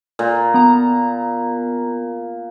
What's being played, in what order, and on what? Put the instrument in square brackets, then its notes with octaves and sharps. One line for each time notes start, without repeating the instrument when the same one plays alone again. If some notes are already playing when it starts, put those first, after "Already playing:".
[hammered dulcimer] A#2
[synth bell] B3 A#5